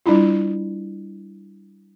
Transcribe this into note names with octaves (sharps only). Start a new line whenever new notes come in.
G3 D4 E4 F4